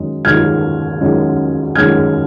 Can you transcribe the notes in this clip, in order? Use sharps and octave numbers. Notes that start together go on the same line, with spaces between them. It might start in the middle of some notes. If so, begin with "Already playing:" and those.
Already playing: F#2 D#3 G#3
F#2 D#3 G#3 F6 G#6
F#2 D#3 G#3
F#2 D#3 G#3 F6 G#6